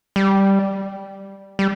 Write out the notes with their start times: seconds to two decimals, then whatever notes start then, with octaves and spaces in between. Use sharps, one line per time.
0.16 G3
1.59 G3